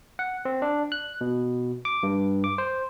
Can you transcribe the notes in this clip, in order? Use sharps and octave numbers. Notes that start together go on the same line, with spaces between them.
F#5
C4
D4
F#6
B2
D6
G2
D6
C5